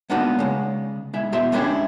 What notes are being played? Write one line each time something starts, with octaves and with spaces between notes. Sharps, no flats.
G#3 A#3 B3 D4 D#4 F#4
C#3 G#3
G#3 E4 E5
B2 G#4 E5 C6
G#3 C#4 D4 E4 G4 G#4